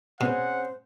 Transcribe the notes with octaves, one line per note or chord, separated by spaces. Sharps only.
B2 C4 C#4 G#4 C5 F#5